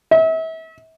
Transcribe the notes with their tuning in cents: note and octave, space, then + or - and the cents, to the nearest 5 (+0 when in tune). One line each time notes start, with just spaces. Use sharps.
E5 -35